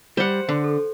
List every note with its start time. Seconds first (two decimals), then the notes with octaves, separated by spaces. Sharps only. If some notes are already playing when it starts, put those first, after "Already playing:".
0.17 G3 C5 F#5
0.49 D3
0.64 A4